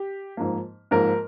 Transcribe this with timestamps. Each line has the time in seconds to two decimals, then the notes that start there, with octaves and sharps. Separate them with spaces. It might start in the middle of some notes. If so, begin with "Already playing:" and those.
Already playing: G4
0.37 G#2 F3 A#3
0.91 G#2 F3 A#3 A#4